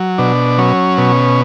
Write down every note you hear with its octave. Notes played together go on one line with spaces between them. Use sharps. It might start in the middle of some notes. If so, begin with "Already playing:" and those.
Already playing: F#3
B2 D4
F#3 C#4
B2